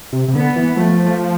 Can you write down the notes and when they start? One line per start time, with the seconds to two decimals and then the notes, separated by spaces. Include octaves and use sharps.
0.13 C3
0.28 C3
0.34 D3 B3
0.56 E3
0.77 F3 A3